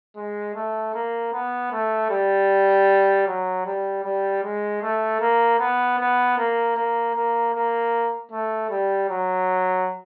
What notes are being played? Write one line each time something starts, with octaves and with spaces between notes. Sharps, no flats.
G#3
A3
A#3
B3
A3
G3
F#3
G3
G3
G#3
A3
A#3
B3
B3
A#3
A#3
A#3
A#3
A3
G3
F#3